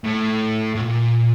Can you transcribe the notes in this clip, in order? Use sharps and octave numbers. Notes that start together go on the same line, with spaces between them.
A2
A2
A#2